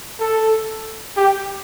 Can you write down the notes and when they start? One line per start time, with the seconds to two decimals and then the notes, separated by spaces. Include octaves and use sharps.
0.20 A4
1.17 G4